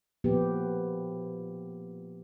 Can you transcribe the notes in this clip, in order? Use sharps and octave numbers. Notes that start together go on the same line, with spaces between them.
A#2 F3 B3 G4